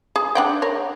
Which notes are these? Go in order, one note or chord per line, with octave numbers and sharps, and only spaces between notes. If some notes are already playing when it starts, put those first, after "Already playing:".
G#4
D4 F#5 G5
A#4 C#5